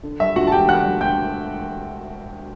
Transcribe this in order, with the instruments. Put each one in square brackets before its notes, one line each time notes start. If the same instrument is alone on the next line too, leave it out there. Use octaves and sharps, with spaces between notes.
[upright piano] D3
G3 E5
D2 F#4 F#5
A5
E1 G4 G5
D3 F#5 F#6
G3
D2 G5 G6